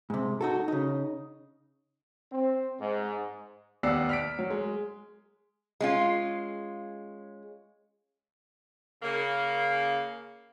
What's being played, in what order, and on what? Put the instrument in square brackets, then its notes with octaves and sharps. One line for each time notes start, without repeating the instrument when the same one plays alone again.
[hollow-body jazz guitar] G#2 C3
D#4 F#4 A4
C#3 D#4
[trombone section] C4
G#2
[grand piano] D#2 B3 D5 F#5 E6 C7
F6 B6 D7
F#3
G#3
[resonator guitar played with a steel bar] G#3 C#4 F4
[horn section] C#3 A#3